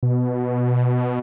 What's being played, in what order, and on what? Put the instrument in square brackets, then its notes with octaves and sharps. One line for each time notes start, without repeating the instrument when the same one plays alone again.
[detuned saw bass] B2